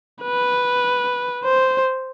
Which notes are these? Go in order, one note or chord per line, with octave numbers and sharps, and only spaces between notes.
B4
C5